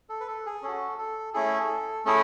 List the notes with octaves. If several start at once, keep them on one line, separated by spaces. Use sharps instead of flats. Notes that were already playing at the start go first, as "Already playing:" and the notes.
A4
B4
A4
G#4
C#4 F#4 A4
A4
A3 C#4 E4 G#4 A4
A3 C#4 E4 G#4 A4